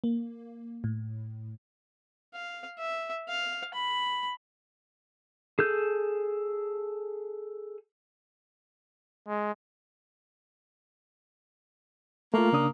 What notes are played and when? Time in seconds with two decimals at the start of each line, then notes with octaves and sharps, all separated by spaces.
0.04 A#3
0.84 A2
2.34 F5
2.78 E5
3.28 F5
3.74 B5
5.59 G#4 A4 G6
9.28 G#3
12.34 A3 A#3 F4
12.53 C#3 D4 D#6